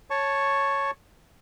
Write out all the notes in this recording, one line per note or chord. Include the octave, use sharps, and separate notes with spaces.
C#5 A5 C#6